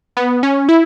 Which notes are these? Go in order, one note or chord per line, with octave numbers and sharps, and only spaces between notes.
B3
C#4
E4